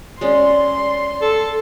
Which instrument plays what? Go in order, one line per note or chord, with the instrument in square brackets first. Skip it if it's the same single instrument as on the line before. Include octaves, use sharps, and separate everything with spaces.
[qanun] G#3 C#4 [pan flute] D5 [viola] C6
[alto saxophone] A4